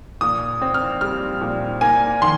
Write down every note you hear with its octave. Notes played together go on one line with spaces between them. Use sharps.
A#2 D#6
C4
F6
G3 F6
A#2
A#3 G#5
D#3 C6